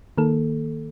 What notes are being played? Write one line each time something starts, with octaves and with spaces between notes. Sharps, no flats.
D#3 A#3 A4